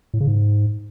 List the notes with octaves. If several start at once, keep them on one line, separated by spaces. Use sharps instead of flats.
A2
C#3
G#2